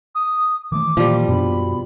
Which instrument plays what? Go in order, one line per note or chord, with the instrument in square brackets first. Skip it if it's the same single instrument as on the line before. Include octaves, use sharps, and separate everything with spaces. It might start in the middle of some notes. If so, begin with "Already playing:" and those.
[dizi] D#6
[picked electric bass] D#3 E3 A3 [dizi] D6
[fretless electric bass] A#2 [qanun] F3 G3
[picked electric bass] F#2 D4 [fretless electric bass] B2 [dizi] B5